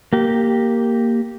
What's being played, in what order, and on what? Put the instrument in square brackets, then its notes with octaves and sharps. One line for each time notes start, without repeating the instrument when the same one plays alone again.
[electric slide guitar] A#3 G4